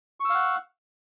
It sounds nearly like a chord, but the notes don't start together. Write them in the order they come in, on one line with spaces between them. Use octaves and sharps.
C#6 E6 F5 F#5